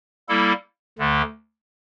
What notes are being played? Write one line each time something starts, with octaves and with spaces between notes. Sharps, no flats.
G3 A#3 E4 A4
D2 D3 A3